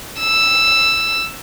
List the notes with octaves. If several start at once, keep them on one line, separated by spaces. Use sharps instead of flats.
E6